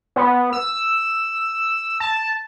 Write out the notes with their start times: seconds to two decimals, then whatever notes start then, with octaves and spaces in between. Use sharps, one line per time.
0.16 B3
0.53 E6
2.00 A5